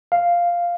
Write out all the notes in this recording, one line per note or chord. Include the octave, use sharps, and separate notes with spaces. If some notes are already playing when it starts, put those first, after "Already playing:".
F5